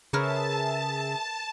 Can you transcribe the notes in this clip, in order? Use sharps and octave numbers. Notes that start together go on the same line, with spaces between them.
C#3 G#4 A#4 B4 C#5 E5 A5